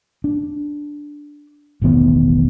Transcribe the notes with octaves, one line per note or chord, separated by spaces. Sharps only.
D4
E1 A1 D#3 B3